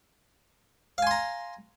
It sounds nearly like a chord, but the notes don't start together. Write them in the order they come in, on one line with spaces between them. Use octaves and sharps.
F5 G#5 C6 A#5